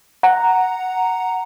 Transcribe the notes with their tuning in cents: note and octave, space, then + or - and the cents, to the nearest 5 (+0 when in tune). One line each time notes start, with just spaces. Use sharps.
F#5 +0 A#5 +0